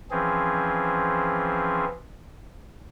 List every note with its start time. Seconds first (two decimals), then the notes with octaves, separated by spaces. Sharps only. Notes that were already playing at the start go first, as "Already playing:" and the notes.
0.11 E3 F3 C4 C#4 G#4